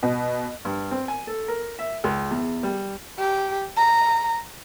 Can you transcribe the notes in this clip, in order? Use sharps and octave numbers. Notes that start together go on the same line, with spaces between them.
B2
G2
C4
G#5
A4
A#4
E5
C#2
E2
G3
G4
A#5